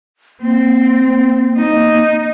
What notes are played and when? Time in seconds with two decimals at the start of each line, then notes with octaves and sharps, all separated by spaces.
0.41 A#3 C4
1.57 D#4